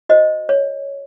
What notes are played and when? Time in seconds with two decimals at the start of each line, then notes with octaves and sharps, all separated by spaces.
0.09 F#4 C5 D#5
0.49 C#5